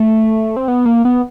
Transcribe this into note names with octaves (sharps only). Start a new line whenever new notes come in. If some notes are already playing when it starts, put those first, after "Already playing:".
Already playing: A3
C4
B3
A#3
B3